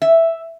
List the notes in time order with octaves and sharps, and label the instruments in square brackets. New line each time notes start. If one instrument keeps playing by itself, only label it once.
[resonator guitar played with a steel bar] E5